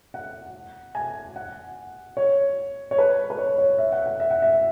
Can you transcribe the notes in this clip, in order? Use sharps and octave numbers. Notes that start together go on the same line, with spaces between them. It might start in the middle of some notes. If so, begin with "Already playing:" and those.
F#5
G#5
F#5
C#5
C#5
B4
B4
C#5
C#5
E5
F#5
F#5
E5
F#5
E5